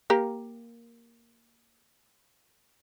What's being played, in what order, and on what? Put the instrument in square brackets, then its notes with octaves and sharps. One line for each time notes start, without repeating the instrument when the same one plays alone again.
[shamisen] A#3 G4 A#4